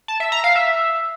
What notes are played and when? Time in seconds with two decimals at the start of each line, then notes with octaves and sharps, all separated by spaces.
0.08 A5
0.20 E5
0.32 A#5
0.44 F5
0.56 E5